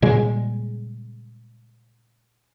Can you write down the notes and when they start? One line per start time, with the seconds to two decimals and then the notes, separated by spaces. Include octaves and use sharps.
0.02 A#2 C#3 G3 G#3